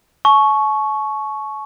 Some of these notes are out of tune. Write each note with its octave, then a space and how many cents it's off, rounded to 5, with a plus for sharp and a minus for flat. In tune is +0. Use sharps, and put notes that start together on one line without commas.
A5 -45 C#6 +0